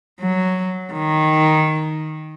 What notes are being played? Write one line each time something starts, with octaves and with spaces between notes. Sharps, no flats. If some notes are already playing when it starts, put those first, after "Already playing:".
F#3
D#3